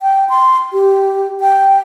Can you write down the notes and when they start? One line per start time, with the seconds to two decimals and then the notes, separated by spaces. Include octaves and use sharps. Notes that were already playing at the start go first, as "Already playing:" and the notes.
0.02 G5
0.29 C6
0.73 G4
1.41 G5